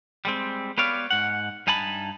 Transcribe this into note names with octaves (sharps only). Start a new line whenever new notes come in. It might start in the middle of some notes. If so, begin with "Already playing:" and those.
G3 G#3 C4
B3 G4 B4 C#5 D5 F5
G#2 F#5
G2 D#4 G#5 A5 B5